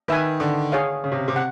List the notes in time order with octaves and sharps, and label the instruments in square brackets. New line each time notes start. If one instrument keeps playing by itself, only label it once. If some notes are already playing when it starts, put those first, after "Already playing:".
[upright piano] D#3 [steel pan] B4 E5 G#5
[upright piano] D3
[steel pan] G#4 C#5 F5
[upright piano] C#3
C3
C3
[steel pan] F#5